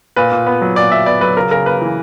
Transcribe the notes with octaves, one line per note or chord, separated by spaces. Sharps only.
A#2 B4
A#2
B3
F#3
A#2 D5
A#2 E5
B3 D5
F#3 B4
C#3 A#4
C#3 A#4
A#3 B4
E3